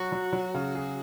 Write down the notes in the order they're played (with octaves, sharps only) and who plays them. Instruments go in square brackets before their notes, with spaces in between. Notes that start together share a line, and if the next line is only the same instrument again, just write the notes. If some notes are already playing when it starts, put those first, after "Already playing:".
Already playing: [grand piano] F#3 [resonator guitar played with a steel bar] F#4
[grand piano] F#3
F#3
C#3
G#4